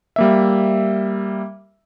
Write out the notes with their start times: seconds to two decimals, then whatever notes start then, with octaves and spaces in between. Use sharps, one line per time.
0.16 G3 A#3 E5